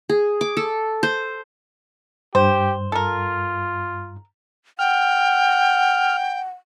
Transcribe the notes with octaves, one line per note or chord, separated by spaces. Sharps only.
G#4
D6
A4
C5
G2 G4 C5
F4 A4 A#4
F#5 G5 F6